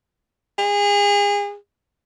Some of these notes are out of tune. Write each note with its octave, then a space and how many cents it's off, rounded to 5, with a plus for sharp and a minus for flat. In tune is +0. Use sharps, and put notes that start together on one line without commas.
G#4 -30